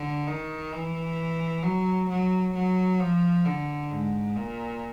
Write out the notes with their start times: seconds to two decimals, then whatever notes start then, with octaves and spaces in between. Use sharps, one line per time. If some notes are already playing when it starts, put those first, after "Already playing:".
Already playing: D3
0.27 D#3
0.72 E3
1.63 F#3
2.08 F#3
2.54 F#3
2.99 F3
3.45 D3
3.91 G#2
4.36 A#2